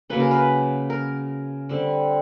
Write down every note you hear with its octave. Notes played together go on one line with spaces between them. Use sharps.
C#3 F#3 A#3 C#4 B4
A#4
B4
A#4
D3 G3 C4